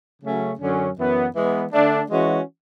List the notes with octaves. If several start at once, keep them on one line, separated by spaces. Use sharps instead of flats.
C#3 F#3 A3 C#4
F#2 D3 F#3 C#4
F#2 E3 B3
E3 G#3 B3
D3 A3 D4
E3 G#3 C#4 F#4